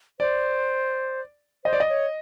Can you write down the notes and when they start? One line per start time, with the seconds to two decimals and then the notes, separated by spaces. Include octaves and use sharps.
0.20 C5 D5
1.65 C5 D#5
1.73 D5
1.80 D#5
1.89 C#5